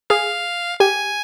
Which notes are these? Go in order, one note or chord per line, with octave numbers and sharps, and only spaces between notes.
G#4 F5
G4 G#5